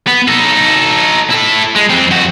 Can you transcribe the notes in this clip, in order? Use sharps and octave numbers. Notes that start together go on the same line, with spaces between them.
B3
D#4 A4
E4 A4
G#3
F2 C4
F2 F#4